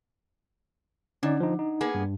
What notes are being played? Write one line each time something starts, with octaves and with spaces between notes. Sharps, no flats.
D3 C#4 D#4 D5
F3 D#4
D#4
A#3 B3 G#4
G2